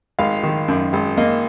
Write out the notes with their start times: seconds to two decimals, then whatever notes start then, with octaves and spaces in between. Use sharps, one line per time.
0.19 G#1 F5
0.43 D#3
0.68 F#2
0.93 G#1
1.17 A#3 D#5